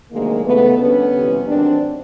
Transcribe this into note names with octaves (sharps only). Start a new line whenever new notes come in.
D2 C3 D#3 F#3 G#3 A#3
D#2 C#3 E3 A3 B3
D2 D3 G3 B3 C#4
F2 C3 E3 G3
G#2 D#3 F#3 C4 D4